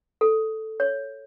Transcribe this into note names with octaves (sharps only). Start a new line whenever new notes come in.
A4
C#5